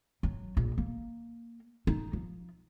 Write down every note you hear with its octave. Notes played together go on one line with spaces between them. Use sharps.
F#3
A#1
A#3
D#4
F3